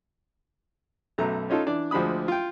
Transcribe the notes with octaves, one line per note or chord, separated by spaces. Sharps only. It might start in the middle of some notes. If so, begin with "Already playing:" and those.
B1 F#2 A3 A#5
C#4 D#4 F4 A4
E3 D4 D5
D2 F3 G#3 D4 B5 D#6
F4 G5